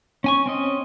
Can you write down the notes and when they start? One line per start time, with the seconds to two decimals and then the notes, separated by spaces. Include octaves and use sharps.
0.24 C#4 G#5 C#6
0.46 C4 C#4 D#5